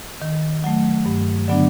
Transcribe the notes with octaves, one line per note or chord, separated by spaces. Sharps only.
D#3
F#3 A3
G2
D3 F#3 B3 D4